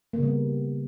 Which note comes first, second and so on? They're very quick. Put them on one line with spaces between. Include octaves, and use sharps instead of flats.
A#3 C#3 G3 B3